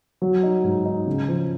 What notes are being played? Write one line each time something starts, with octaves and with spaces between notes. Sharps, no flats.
F#3
D#4
G#2
D#4
C#3
F3